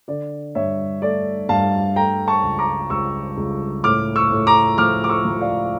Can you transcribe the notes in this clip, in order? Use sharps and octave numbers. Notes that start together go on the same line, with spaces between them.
D3 D5
G2 C#5 E5
A3 D5
G2 F5 A5
A3 G5 A#5
A5 C#6
C#2
A#5 D6
C#2 C#6 E6
C#2
A2 D6 F6
C#6 E6
A2
A#5 D6
F3 D6 F6
D6
C#6 E6
F3
D5 F5